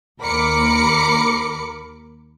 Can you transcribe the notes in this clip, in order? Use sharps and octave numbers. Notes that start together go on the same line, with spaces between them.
D#2 A#4 B5 D6 C#7